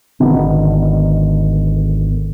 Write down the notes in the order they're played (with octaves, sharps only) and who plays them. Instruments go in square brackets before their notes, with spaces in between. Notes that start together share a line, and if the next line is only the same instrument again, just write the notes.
[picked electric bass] G#1 D3 D#3 B3